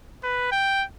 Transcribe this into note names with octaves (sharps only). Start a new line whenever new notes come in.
B4
G5